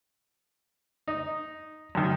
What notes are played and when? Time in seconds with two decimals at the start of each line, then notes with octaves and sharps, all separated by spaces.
1.08 D#4
1.95 F#2 D#3